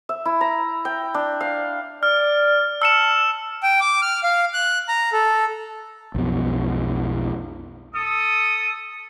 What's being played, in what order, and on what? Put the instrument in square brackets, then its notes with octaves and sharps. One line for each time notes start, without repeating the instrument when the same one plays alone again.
[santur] E5
E4
A#5
G5
D4
F5
[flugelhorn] D5 [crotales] F6
[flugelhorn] A5 [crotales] E6 C#7 E7
[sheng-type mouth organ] G5
D6
F6
F5
F#6
A#5
A4
[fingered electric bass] B1 F2 B2
[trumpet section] A4 D#6